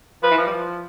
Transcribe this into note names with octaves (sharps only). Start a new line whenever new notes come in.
F3 B4
E3
F3
G3
F3